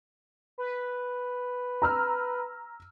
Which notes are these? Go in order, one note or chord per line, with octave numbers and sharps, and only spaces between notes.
B4
A#5 E6 F6